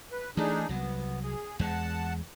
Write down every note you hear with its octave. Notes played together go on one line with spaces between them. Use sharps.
B4
E3 A3 D4 D#4 G#4
C2 F#3 B3
G#4
E2 G#3 F#5 A5